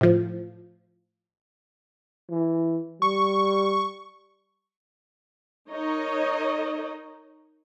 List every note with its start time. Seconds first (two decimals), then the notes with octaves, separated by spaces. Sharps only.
0.01 A2 F3
2.30 E3
3.02 G3 C#6
5.70 D#4 A#4 C#5 D#5